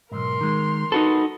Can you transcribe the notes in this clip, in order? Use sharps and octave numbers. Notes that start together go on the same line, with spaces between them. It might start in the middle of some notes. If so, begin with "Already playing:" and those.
B1 E2 G#2 A#4 C6
D#3 G#3
D#4 F#4 A4 B4